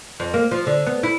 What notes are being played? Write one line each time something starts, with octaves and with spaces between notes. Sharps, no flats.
F2
A#3
F3
D3
B3
E4